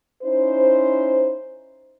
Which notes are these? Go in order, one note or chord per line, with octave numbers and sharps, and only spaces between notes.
C#4 D#4 E4 C5